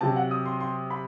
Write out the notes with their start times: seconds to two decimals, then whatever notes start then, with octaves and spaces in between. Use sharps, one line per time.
0.01 C3 F#3 A5
0.16 F#5
0.31 D#6
0.46 C6
0.60 C6
0.90 B5